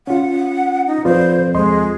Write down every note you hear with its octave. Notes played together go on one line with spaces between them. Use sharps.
C#4 F4 F#5
D#4
F2 F4 B4 C5 D5
D#2 G#3 D#5 C6